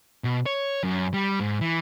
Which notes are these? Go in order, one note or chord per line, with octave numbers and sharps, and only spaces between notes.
B2
C#5
F#2
G3
G#2
E3